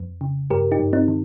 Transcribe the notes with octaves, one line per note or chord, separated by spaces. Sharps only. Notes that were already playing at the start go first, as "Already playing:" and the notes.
Already playing: F2
C#3
G2 G4 A#4
D#4 G4
G2
C4 D#4
D#3